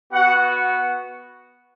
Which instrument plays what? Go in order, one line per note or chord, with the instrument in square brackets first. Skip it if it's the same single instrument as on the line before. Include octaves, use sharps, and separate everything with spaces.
[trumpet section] B3 F#4 F#5